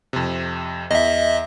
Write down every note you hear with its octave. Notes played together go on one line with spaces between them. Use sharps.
F2 C3
E2 D#5 E5